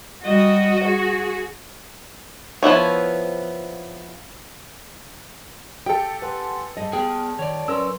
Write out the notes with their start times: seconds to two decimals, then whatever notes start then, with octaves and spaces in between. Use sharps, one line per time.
0.24 G3 F#4 D#5
0.85 G#4
2.63 F3 B3 E4 C#5
5.86 G4 A4 G5
6.22 B4 F#5 G#5 C6
6.77 G#2 G3 D#5 A5
6.93 B3 G#4 G5
7.39 D#3 C#5 D5
7.68 F#3 C#4 A#4 B4 C6 E6